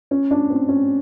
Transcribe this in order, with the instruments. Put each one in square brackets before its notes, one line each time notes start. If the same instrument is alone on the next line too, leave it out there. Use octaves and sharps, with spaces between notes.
[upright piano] C#4
D4
C4
C#4